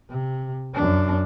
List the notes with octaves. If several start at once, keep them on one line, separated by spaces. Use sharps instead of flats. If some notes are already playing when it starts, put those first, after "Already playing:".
C3
F#2 D4